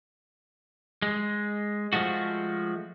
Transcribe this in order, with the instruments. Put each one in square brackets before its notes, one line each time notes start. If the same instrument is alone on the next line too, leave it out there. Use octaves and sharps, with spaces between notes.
[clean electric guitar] G#3
F3 G#3 A3 F#4